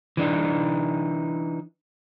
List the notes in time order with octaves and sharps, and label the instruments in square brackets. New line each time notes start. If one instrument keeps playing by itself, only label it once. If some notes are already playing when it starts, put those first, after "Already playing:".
[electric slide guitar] E3 D4 D#4